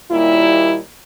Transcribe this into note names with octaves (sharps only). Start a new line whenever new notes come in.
D#2 A#2 G3 E4